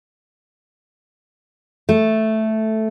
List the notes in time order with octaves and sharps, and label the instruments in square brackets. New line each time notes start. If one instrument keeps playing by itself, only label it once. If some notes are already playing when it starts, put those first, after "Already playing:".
[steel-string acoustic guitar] A3